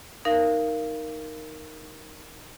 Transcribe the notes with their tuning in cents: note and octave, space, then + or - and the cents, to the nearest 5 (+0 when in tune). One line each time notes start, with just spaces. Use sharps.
D#4 +0 A#4 +0 F5 -20